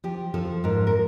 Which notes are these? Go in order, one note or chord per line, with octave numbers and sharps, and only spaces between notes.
F3 G4
F3 A4
G#2 A#4
A#4